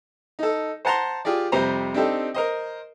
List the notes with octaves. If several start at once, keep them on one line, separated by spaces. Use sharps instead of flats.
D#4 A4
C5 F#5 A5 A#5 C6
F4 G4 G#4 D5
F2 C3 G3 C5 A#5
C4 D4 D#4 G4 A4
A#4 C5 D#5